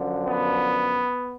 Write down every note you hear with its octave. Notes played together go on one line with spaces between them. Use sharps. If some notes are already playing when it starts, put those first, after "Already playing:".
Already playing: F#2 D3 F3
B3